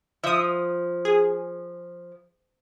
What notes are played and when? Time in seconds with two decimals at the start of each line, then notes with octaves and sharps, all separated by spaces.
0.24 F3 E5 D#6
1.05 G#4